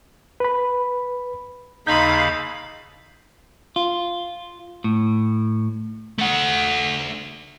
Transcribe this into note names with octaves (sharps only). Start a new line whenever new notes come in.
B4 B5
D#2 C#3 D#4 F5 B5 C6 G6
F4
A2
A3 F#5